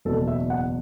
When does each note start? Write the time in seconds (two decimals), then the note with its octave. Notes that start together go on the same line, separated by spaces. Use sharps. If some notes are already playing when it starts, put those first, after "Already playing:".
0.05 F#1 E2 B2 A4
0.28 E5
0.50 F#5